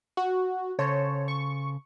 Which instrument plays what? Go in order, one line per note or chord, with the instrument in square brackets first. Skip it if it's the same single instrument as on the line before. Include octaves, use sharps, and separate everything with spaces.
[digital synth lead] F#4
[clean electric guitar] C#3 A4 C5 [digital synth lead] C#5
[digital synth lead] C#6